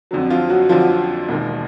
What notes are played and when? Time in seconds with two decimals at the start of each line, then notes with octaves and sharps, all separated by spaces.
0.11 F2 D3 F#3
0.30 F3 F4
0.49 F#3 F#4
0.69 F2 D3 F3 F#3 F4
1.29 E1 D#2 D#3